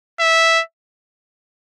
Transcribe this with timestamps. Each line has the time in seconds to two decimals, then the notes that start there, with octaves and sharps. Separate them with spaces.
0.20 E5